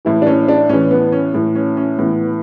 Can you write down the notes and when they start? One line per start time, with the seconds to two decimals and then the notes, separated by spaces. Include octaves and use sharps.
0.05 A2 E3 E4
0.22 D4
0.27 C#4
0.48 D4
0.69 A2 E3 C#4
0.91 B3
1.12 C#4
1.34 A2 E3
1.55 C#4
1.77 C#4
1.98 A2 E3 B3